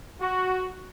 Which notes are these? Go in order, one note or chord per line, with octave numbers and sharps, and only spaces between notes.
F#4